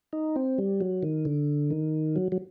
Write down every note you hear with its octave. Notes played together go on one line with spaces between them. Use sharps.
D#4
C4
G3
F#3
D#3
D3
D#3
F#3
F#3